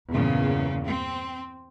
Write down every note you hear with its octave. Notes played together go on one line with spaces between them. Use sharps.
E2 G2 A#2 C#3
C4